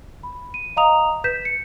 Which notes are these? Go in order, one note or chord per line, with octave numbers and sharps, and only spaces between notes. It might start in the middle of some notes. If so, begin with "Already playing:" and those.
B5
D#7
D#5 F5 A#5 D#6 F7
B4 G6 B6 E7
C#7